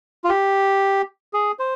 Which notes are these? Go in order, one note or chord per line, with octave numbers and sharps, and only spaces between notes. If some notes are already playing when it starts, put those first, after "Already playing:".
F4
G4
G#4
C5